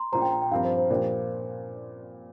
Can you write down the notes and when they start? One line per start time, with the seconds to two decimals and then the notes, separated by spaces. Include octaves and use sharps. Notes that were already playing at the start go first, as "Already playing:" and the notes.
Already playing: A#5 C6
0.12 A#1 A#2 A#3 F4 C5 A#5
0.22 G5
0.32 A#5
0.42 G5
0.51 G2 F3 C4 A#4 F5
0.65 C5
0.77 C5
0.90 A#2 F3 D4 G4 A#4